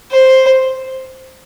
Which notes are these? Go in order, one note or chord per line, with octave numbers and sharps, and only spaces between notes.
C5